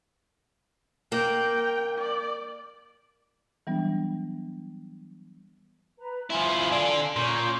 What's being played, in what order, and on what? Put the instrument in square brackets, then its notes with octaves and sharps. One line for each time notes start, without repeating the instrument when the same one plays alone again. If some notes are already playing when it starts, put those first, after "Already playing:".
[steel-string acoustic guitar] A#3 [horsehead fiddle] G5
[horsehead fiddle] D5
[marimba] E3 F#3 G3 B3 D4
[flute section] B4 A#5
[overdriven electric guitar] F3 E4 [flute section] F5 G#5 C6
[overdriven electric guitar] D4 A4
[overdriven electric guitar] A#2 [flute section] C#4 G6